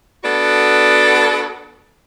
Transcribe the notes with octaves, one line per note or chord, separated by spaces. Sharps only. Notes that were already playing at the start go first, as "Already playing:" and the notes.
B3 D4 F#4 A4